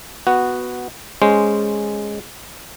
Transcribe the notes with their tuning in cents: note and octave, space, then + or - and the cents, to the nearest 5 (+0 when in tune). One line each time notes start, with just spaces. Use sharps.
B3 +0 F#4 +0
G#3 +0 C#4 +0 C5 -5